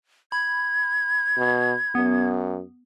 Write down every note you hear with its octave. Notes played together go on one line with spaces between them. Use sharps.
B5 G#6
B2
F#2 B3